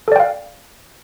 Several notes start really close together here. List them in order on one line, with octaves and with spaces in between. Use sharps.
A4 D5 G5 F5